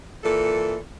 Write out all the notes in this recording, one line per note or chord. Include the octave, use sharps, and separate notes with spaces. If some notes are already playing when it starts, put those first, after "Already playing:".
A#2 E3 A4